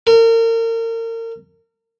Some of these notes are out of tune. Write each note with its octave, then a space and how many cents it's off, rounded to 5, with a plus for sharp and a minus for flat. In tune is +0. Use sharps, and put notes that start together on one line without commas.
A#4 -35